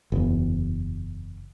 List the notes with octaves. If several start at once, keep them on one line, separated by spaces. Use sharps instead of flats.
F#1 E2